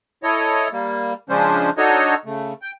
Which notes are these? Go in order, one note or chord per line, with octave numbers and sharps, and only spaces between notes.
E4 A4 C#5 D#5
G3 A#3
C#3 F3 G#3 C#4 D4 C5
D4 D#4 F#4 A4 C#5 D#5
C#3 A3
G5